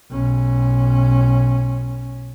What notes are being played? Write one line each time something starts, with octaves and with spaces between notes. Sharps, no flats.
B1 C#4